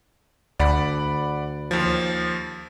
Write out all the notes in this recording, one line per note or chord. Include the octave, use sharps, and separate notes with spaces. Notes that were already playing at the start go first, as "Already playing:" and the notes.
D2 D5 F#5 B5
D#2 F3